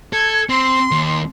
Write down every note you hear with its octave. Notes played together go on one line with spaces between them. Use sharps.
A4 G#6
C4 C6
D#2